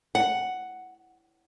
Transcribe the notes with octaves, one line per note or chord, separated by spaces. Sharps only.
F#5